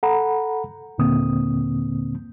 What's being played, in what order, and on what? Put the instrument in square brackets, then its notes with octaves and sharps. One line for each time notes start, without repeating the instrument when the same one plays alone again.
[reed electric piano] A4 F#5 A#5 B5
D#2 A#2 D3 A#3 C4 D#6